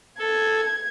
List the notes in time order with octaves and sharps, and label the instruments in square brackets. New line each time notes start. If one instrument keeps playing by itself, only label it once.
[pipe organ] A4 [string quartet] G#6